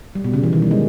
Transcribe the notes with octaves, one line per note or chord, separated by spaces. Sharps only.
G3
B2
C#3
E3
D#3
G3
G#3